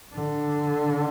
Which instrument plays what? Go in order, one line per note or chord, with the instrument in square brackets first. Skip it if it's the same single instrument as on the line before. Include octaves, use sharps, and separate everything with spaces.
[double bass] D3